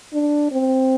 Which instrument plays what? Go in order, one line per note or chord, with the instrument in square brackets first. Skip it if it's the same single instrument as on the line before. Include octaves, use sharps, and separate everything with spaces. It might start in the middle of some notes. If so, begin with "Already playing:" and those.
[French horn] D4
C4